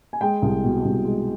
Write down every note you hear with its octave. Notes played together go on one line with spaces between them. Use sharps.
G#5
G#3 G5
C2
B2
C2
G#3